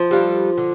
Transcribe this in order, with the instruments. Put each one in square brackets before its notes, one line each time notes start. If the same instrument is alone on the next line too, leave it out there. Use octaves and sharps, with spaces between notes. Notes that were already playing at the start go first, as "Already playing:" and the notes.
Already playing: [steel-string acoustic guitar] F3
[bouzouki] G3 D4 F4 A4
D3